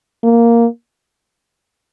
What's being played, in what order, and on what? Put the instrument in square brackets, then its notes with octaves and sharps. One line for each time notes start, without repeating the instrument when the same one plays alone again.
[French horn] A#3